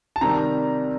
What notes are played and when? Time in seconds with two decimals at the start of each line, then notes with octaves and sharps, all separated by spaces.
0.16 A5
0.21 C3 D#3 G3 C4 A#5